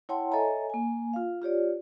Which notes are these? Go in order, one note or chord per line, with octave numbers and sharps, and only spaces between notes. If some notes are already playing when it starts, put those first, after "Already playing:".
E4 C#5 F#5 G5 A5 C6
A4 C#5 D#5 E5 G#5 A#5
A#3 G#5
F4 F5
F4 G4 C#5 D5